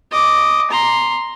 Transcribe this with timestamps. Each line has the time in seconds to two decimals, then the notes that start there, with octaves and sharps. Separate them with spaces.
0.11 D#5 D6
0.70 A#5 C6